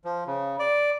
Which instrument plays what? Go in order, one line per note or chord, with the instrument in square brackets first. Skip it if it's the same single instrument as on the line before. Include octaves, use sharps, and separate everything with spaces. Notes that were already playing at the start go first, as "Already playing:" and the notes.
[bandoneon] F3
C#3
D5